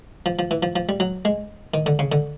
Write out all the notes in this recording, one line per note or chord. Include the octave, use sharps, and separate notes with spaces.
F3
F3
E3
F3
F3
G3
F#3
G#3
D#3
D3
C#3
D3